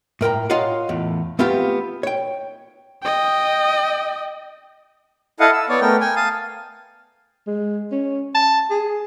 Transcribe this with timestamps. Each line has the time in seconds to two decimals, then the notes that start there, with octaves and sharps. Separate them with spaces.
0.21 A2 A#4 G5 A#5
0.50 F4 C#5 D#5 F5 F#5
0.89 E2 A2
1.39 A3 B3 C4 F4 G4
2.03 C#5 G5
3.03 D#5 G5
5.40 E4 A4 D#5 F5 F#5
5.53 E6
5.69 B3 C#5 D5
5.81 A3 B3 A#4 G5
6.01 G5 G#5
6.16 F5 A5 D#6
7.47 G#3
7.92 C#4
8.35 A5
8.70 G#4